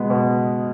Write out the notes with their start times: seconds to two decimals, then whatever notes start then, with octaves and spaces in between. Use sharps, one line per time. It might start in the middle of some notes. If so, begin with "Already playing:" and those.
Already playing: B2 G#3 B3
0.10 B2